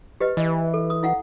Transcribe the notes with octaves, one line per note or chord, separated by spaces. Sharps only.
G4 B4 D#5
E3 D#5
A4
D#6
E4 F5 F#5